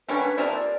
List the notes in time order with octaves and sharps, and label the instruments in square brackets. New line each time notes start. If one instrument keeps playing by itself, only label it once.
[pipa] D3 G3 A#3 C#4 [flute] B4
[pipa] C3 F3 A#3 [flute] D5
[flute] D5